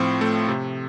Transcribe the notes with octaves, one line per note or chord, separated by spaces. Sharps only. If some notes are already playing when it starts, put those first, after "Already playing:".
Already playing: A2 F3 C4
A3
C3